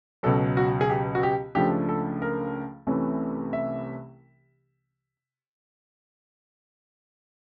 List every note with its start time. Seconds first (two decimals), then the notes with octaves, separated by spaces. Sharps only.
0.23 C#2 B2 F#3 A4
0.57 F#4
0.81 G#4
0.90 G4
1.15 F#4
1.23 G4
1.55 C#2 C#3 F3 A3 D4 G4
1.89 A4
2.22 A#4
2.87 C2 C3 E3 A3 C#4
3.53 E5